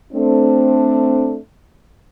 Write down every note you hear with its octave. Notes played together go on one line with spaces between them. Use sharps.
A3 C4 D4